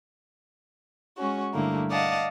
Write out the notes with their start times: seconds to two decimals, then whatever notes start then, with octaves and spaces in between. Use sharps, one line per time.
1.16 G#3 C#4 F#4
1.53 G2 D3 A3 A#3 E4
1.91 D5 D#5 F5 F#5 A5